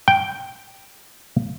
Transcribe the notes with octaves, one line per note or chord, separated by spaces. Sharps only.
G5